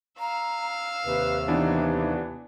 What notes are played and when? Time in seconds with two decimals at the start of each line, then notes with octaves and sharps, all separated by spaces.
0.20 F5 A#5 E6
1.05 D#2 C3 B4
1.48 E3 B3 D4 D#4